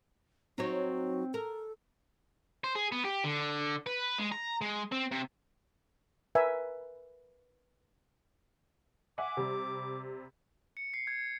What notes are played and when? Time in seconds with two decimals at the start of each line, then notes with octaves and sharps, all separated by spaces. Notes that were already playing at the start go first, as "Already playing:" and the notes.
0.58 F#3 C4 D#4 F#4 C#5
1.34 A4 A#4
2.64 C5
2.75 G#4
2.92 B3
3.05 G4
3.24 D3
3.86 B4
4.19 G#3
4.32 A#5
4.61 G#3
4.92 C4
5.12 C3
6.35 A#4 B4 E5 G#5
9.18 E5 F#5 G#5 D6
9.37 C3 G3
10.77 C#7
10.94 C7
11.07 G#6